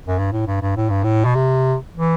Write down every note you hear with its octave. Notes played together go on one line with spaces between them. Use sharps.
F#2
G2
A2
G2
G2
A2
G2
A2
B2
C3
E3